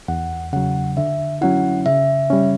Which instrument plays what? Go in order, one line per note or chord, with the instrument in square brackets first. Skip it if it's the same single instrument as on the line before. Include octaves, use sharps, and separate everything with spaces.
[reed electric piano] E2 [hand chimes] F#5
[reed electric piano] C#3 F#3 [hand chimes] F#5
[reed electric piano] D3 [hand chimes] E5
[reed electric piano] F#3 C#4 E4 [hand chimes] F#5
[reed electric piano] C#3 [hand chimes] E5
[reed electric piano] G3 C#4